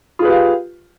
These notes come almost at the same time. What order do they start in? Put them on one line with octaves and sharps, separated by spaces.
F4 G#4 B4 G4 F5